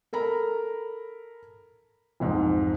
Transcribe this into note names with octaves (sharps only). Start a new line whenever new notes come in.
A4 A#4 A#5 B5
B1 F2 G#2